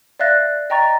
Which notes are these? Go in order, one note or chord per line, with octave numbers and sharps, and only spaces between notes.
D5 E5 F5 F#6 A6 A#6
D#5 G5 A#5 C#6 A6